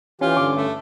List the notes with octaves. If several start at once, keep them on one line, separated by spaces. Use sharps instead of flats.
E3 C#4 F4 G4
G2 D3 D6
A3